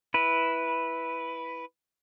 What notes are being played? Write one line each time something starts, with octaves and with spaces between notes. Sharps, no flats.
E4 B4